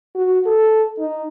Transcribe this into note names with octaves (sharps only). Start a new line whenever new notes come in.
F#4
A4
D#4